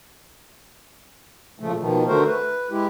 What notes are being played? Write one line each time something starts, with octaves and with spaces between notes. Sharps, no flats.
A#2 C#3 F3 A3
B2 D#3 F3
D3 A3 F#4 A#4 C5
B4
G#3 E4 G4